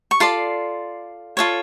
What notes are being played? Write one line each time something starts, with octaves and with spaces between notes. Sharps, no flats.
C#6
F4 A4 D5 C6
F4 A4 C#5